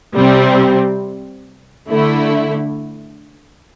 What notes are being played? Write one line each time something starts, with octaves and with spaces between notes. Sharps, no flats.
C3 G3 C4
D3 A3 E4